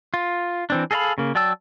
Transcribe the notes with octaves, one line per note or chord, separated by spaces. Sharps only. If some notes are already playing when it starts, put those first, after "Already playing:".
F4
E3 C4 D4
G#4 A4 D#5 F5 B5
C#3 A#3
F#3 D5 G5 A5 E6